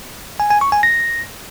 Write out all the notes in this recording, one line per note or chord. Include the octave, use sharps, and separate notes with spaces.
G#5
G#5
C#6
G#5
A#6